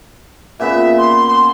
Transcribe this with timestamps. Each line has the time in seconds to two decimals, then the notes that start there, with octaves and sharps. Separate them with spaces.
0.60 A#2 C#3 B3 E5
0.97 C6
1.28 C6